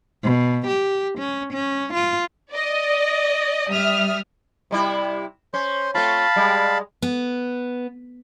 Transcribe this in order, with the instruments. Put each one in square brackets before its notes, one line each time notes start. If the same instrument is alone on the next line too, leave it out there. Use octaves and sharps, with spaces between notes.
[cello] B2
G4
C#4
C#4
F4
[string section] D5 D#5
G3 E5 D#6 F6
[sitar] C3 G3 E4
[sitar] C#4 [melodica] C5 C6
[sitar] A3 C4 F4 [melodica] F5 A5 B5
[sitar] G3 G#3
[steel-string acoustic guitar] B3